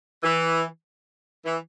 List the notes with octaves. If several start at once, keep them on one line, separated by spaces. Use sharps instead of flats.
E3
E3